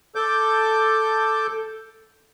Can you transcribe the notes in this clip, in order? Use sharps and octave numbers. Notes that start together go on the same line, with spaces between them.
A4 D6 G6